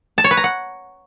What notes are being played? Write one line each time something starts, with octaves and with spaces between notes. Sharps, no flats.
A5
C#5
B4
A#5
F#5